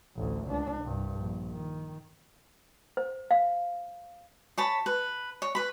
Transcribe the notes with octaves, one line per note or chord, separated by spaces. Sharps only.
A1 D2
C#2 D4
C2 G2
A#1
D#3
C5
F5
C#5 A5 B5
B4
C#5
B4 B5